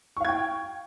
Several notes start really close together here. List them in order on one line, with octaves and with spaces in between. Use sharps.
C#6 F5 G#6 G5